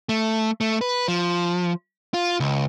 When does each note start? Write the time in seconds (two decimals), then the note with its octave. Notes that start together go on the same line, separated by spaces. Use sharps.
0.09 A3
0.61 A3
0.81 B4
1.08 F3
2.14 F4
2.40 C#2